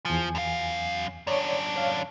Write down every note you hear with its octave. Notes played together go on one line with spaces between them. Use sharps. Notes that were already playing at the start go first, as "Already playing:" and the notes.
E2 F3 G#5
F#2 F5
F#2 D4 C#5 D5
C#5 F5